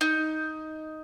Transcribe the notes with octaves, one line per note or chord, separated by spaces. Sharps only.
D#4